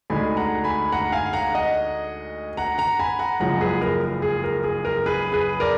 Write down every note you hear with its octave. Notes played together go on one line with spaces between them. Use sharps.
D2 D3 G#3 D#4 G#5 B5
F#5 A#5
G#5 B5
F#5 A#5
F5 G#5
F#5 A#5
D#5 F#5
F#5 A#5
F#5 A#5
G#5 B5
F#5 A#5
F#1 F#2 F3 G#3 F#5 A#5
G#4 B4
A#4
G#4
A#4
G#4
A#4
G#4 B4
G#4 B4
A#4 D5